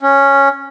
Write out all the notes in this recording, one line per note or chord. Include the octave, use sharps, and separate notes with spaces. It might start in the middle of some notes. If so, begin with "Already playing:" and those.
C#4